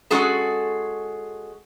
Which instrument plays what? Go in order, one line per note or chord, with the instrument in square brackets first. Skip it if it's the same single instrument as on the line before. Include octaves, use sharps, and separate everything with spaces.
[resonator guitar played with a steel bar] G#3 C#4 F#4 G#4 A4